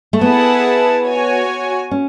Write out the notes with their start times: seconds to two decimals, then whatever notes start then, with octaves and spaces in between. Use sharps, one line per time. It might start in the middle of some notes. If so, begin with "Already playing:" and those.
0.13 A3
0.21 B3 E4 G#4 B4 F#5 A5
1.06 F#4 C#5 G#5
1.91 C#4